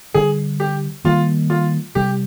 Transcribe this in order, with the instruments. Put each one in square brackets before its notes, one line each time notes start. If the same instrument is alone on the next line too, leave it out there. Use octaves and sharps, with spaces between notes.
[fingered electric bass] D3 G3 D4 [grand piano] G#4
[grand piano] G4
[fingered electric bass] D#3 G3 A#3 [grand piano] F4
[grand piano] F4
[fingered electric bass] C3 G3 D4 [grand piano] G4